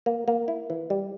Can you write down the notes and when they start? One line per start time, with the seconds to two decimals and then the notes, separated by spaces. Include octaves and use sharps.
0.06 A#3
0.28 A#3
0.48 E4
0.70 E3
0.90 G3